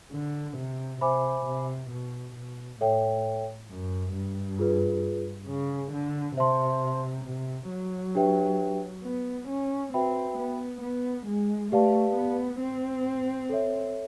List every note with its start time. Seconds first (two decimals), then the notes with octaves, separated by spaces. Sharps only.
0.13 D3
0.58 C3
1.01 C3 C5 E5 G#5 B5 D6
1.46 C3
1.91 B2
2.35 B2
2.80 A2 A4 C#5 E5 G5
3.70 F#2
4.14 G2
4.59 F4 G#4 B4
5.48 C#3
5.93 D3
6.37 C3 C5 E5 A5 C6
7.25 C3
7.70 F#3
8.15 D4 G4 B4 E5 G5
9.04 B3
9.49 C#4
9.94 C4 F#4 B4 E5 G5 B5
10.39 B3
10.82 B3
11.27 G#3
11.72 A3 G4 B4 D5 F5 A5
12.17 B3
12.60 C4
13.49 A4 C#5 E5